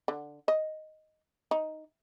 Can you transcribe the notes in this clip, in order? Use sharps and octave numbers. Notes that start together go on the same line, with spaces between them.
D3
D#5
D#4